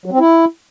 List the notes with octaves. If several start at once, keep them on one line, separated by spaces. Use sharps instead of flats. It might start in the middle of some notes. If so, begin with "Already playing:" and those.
F#3
C4
E4